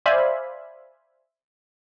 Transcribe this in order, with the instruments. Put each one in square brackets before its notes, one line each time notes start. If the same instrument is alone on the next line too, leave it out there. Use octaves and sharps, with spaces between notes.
[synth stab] C5 D5 E5 F5 G#5 B5